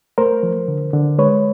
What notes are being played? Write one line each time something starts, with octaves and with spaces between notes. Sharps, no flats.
A3 A#4 C5
F3
D3
D3
G#3 B4 C#5